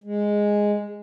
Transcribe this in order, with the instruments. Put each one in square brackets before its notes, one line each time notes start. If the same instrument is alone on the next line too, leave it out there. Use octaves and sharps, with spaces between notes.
[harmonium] G#3